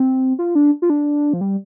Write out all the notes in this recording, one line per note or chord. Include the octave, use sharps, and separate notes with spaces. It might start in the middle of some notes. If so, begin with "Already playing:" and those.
Already playing: C4
F4
D4
F4
D4
F3
G3